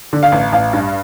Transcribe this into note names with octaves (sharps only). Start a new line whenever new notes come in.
D3
F5
A1
A1 F5
G2